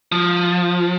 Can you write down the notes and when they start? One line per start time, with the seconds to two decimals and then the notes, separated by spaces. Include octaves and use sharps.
0.12 F3